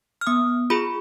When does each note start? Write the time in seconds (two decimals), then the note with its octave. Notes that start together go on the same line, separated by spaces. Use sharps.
0.21 F6
0.27 B3 D#6
0.70 F4 G#4 B5